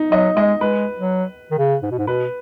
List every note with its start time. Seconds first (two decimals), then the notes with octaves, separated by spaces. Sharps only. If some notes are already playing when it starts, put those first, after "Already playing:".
Already playing: D#4
0.12 F#3 D#5
0.36 G#3 D#5
0.60 G#3 B4
0.98 F#3
1.52 D#3
1.58 C#3
1.83 G#2
1.91 B2
1.98 G#2
2.07 B2 B4